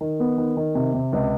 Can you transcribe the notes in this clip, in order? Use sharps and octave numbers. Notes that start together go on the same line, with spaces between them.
D#3
B3
D#3
D#3
C3
C3
C#2